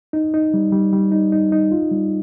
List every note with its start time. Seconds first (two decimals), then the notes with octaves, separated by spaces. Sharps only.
0.13 D#4
0.34 D#4
0.54 G3
0.72 G3
0.93 G3
1.12 D#4
1.32 D#4
1.52 D#4
1.72 F4
1.91 G3